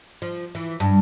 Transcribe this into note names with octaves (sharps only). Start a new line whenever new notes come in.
F3
E3
G2